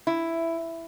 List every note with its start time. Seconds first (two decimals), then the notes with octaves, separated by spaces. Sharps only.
0.07 E4